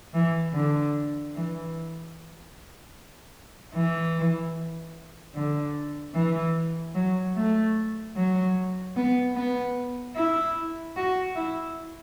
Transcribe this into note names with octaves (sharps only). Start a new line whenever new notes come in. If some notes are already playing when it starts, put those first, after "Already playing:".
E3
D3
E3
E3
D3
E3
F#3
A3
F#3
B3
B3
E4
F#4
E4